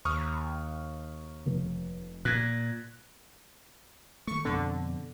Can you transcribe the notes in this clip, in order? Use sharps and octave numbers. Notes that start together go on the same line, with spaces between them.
D#2 C#6 D#6 F6
F1
A#2 F#6 G#6
D#3 A3 C#6
F2 B2 D3 C4